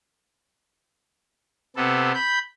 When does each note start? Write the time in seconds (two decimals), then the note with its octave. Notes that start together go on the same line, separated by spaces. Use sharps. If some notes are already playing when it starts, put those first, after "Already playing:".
1.76 C3 B3 A4
2.14 B5 G6